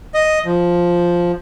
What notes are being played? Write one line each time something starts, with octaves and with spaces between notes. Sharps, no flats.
D#5
F3